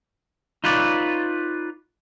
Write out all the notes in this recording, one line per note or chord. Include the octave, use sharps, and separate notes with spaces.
D#4 F4 B4 C#5 D5